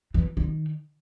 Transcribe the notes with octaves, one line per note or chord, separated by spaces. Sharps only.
E3
D#3